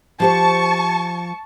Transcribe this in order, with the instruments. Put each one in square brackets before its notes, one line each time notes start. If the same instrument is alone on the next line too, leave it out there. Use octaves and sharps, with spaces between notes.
[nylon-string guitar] F3 G4 C5 [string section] A5 C#6